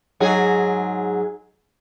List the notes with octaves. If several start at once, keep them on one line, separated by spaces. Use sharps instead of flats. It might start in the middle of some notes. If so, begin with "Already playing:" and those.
G#2 F#3 G#4